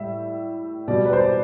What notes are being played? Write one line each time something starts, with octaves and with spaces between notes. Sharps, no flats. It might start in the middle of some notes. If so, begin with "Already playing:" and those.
Already playing: A2 G3 E5
B2 G3 D5
B4
C5
D5